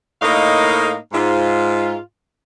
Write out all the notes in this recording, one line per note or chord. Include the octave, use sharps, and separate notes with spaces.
A2 A#3 D#4 A#4 D#5 F5
G#2 F4